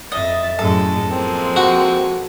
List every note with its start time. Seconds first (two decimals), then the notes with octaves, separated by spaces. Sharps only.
0.12 F2 D#5 E5 A6
0.59 F#2 A2 G#3 A4
1.10 F3 G#3 A#3 C4
1.56 F#4